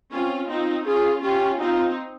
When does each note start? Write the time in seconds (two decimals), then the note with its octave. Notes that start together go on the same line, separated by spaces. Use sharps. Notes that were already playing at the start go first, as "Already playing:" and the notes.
0.12 C4 C#4 F4
0.49 C4 D#4 F4
0.86 C#4 F4 G#4
1.23 C#4 F4 G4
1.60 C4 D#4 F4